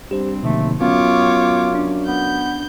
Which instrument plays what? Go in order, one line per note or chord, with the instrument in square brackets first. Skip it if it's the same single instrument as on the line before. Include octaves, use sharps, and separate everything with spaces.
[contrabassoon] G2 [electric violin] C4 [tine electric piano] G4 C5
[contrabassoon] D#2 [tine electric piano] B2 D3 F3 [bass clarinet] A3
[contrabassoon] F#2 [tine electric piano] B3 [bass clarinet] F4 [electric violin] C#5 D6
[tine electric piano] D4
[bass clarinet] B3 [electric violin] G6